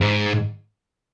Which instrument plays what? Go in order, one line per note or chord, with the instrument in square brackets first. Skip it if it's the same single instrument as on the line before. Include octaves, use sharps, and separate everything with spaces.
[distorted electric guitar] G#2